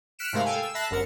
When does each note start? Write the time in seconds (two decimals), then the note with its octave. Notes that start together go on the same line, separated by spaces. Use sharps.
0.19 F6 F#6 B6 C#7 D7 E7
0.33 G#2 C3 A3 A#4 F5 B5
0.45 A4 F5 G5 G#5
0.62 E6
0.74 E5 A5 B5 F#6 A#6 C7
0.90 G1 F#2 A#4 A6 C#7